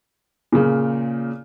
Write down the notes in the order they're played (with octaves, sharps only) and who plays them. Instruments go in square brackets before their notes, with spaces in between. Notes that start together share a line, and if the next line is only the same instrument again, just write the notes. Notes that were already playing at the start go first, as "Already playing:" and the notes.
[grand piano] A#2 C#3